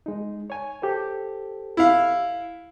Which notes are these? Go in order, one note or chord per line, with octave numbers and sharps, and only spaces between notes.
G#3 D#4
C#5 G#5
G4 A4 C5
E4 F5